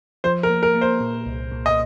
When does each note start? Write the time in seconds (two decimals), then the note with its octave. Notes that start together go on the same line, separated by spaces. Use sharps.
0.24 F3 C5
0.43 A#4
0.50 A#3
0.63 A#4
0.75 A#3
0.81 C5
1.01 A#2
1.26 C2
1.51 A#2
1.66 D#5